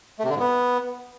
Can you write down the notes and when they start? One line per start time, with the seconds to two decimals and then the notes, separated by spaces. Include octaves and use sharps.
0.19 A3
0.24 C3
0.29 D3
0.35 G#2
0.40 B3